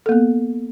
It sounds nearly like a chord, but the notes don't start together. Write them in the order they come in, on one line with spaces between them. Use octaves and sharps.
A4 A#3 B3